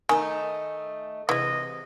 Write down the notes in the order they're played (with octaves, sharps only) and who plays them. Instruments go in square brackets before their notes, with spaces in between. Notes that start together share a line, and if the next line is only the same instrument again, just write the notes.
[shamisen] D#3 [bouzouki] A3 D#4 [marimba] G#5
[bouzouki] C3 [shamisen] E3 G#3 [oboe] D#5